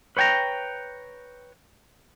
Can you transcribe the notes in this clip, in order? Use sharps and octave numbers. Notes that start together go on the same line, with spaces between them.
B4 C#5 G5 G#5 A#5